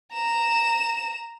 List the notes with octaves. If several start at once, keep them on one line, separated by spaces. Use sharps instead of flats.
A#5 E7